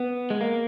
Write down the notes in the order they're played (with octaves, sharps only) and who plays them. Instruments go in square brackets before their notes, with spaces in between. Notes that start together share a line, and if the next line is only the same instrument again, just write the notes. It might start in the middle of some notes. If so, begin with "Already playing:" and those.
Already playing: [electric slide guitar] B3
G#3
A#3